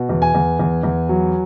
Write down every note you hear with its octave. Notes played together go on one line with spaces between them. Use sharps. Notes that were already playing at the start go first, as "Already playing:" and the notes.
Already playing: B2
E2
G#5
E2
E2
E2
F#3